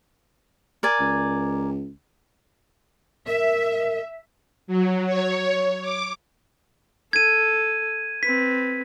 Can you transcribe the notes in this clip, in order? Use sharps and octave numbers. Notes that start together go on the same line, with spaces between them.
A#4 D5 G#5
C#2
A#4 E5
F#3
C#5
D6
A4 G#6 D#7
C4 B4 B6